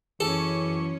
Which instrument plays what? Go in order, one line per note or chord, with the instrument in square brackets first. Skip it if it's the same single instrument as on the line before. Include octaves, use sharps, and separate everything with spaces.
[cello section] F#2 C#4 C#5 [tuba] E3 [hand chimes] G#4 [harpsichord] A4